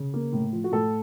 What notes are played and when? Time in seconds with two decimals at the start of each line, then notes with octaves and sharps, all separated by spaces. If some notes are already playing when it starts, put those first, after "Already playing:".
Already playing: C#3
0.14 A#3
0.33 A2
0.53 F3
0.64 F#4
0.72 A2 A4